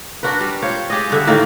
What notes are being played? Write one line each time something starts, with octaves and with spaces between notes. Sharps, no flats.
D4 F#4 A#4 B4
G3
F4 C5 C#5
G4 G#4 D5 D#5
G2 D3 E5
A2 D#3 A#3